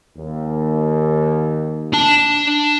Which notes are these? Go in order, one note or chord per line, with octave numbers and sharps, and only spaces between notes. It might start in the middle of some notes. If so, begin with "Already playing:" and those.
D#2
D4 A5